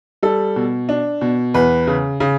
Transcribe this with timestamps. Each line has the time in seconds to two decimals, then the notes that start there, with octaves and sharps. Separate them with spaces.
0.23 G3 A4
0.56 B2
0.89 D4
1.21 B2
1.54 E2 B4
1.87 C#3
2.20 C#3